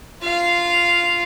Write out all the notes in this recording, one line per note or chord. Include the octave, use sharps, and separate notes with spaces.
F4 F5